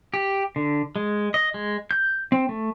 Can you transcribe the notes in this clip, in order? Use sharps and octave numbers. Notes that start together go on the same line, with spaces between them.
G4
D3
G#3
D#5
G#3
G6
C4
A3